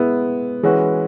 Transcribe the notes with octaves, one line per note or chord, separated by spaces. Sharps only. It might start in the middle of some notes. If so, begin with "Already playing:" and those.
Already playing: G#3 B3 E4
E3 G#3 C#4 F#4 B4